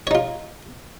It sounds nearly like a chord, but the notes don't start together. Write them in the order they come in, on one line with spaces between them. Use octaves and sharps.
C#5 D#4 F4